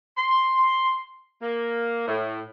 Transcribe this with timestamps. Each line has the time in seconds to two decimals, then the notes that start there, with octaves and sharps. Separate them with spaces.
0.17 C6
1.42 A#3
2.08 A2